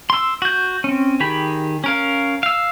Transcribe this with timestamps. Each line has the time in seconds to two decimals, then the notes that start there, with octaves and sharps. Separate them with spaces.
0.10 C6 E6
0.42 F#4 G6
0.84 C4 C#4
1.20 D#3 G4 G#4 B5
1.84 C#4 A#4 F5
2.43 F5 E6